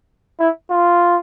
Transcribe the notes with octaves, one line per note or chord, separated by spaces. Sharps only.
E4
F4